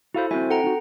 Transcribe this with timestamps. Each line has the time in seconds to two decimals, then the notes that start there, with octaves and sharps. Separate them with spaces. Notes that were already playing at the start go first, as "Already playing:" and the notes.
0.15 E4 F#4 A4 C5 F5 B5
0.31 C4 E4 F#4 C5 G#5
0.50 A4 F#5 G5 A#5
0.64 D#4 F#4